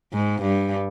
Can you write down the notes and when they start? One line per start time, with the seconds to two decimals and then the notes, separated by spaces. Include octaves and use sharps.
0.13 G#2
0.42 G2